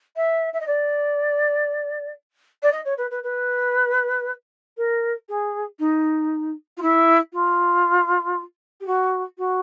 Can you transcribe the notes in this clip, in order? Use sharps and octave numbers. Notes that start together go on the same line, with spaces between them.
E5
E5
D#5
D5
D5
D#5
C#5
B4
B4
B4
A#4
G#4
D#4
F4
E4
F4
G4
F#4
F#4